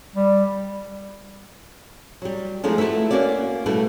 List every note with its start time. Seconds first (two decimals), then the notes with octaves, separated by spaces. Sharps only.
0.15 G3
2.22 F#3 G3
2.64 F3 G#3 A3 D#4 E4
2.78 A3 E4 F#4 B4 E5
3.11 A#3 C#4 F#4 D5
3.66 B2 G3 A3 E4 F#4 B4